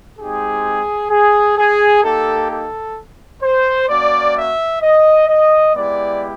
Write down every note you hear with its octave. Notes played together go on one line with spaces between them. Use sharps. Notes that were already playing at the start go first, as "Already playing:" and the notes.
G#3 C4 D#4 G4 G#4
G#4
G#4
A#3 D#4 G4 A4
A4
C5
A#3 C#4 F#4 D5
E5
D#5
D#5
G#3 B3 E4 G4 D5